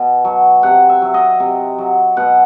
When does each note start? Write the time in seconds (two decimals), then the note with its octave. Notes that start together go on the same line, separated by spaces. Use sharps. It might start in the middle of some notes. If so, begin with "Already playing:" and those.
Already playing: B2
0.25 F#3
0.63 C3 F#5
0.89 E5
1.02 F#3
1.14 D#5
1.40 C3
1.78 F#3
2.17 B2 F#5